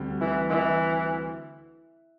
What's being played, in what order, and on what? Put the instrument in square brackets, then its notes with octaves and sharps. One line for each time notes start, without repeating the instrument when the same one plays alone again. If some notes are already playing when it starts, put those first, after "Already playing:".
Already playing: [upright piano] D2 D3 G3 C4
[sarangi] E3
E3